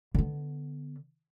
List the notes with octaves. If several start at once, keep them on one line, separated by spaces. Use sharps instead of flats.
D3 B3